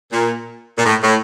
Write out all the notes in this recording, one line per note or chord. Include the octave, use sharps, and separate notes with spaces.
A#2
A#2
A2
A2